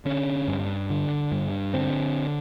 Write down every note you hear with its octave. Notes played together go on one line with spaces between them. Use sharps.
D3 C#4
G2
D3
G2
D3 C4